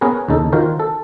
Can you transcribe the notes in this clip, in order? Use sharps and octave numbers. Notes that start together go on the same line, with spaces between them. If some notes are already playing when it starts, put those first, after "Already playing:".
B3 C#4 G#4 A#4 B4
D#2 C#3 D#4 A4
D#3 F4 F#4 A#4 C5
A4